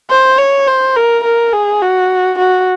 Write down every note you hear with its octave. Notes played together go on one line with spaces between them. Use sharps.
C5
C#5
C5
A#4
A#4
G#4
F#4
F#4